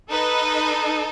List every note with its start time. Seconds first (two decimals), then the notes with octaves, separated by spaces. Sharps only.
0.10 D#4 A4 B4 D#5